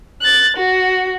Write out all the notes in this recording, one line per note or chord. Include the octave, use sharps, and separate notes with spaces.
F#6 A6
F#4